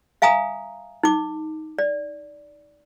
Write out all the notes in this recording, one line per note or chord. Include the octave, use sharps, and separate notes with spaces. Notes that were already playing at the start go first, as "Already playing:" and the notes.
E5 F5 G#5 A#5 D#6
D#4 D6
D5